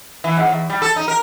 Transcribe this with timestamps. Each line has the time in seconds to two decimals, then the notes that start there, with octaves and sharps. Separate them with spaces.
0.24 E3
0.37 G#2
0.49 E2
0.70 G3
0.82 A4
0.96 D#4
1.08 A#4